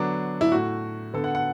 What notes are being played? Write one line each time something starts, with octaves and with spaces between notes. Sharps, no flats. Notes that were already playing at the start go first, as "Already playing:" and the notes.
Already playing: D3 F#3 B3 D4
E4
A2 A3 F#4
D3 B3 A4
F#5
F#5